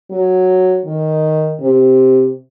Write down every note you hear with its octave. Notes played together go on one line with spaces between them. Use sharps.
F#3
D#3
C3